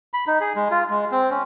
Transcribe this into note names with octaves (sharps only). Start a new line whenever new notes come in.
B5
D#4
G#4
G#3
F4
G#3
C4
C#4